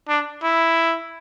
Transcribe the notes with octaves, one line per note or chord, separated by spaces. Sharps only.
D4
E4